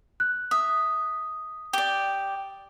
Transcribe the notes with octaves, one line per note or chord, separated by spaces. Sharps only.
F#6
E5 D#6
G4 D5